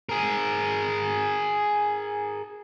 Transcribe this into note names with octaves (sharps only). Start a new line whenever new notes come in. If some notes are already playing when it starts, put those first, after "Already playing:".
G#4 A#4